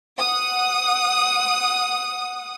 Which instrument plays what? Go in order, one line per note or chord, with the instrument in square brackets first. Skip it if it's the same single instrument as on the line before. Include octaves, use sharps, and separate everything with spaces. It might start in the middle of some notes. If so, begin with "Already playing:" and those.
[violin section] F#5 D#6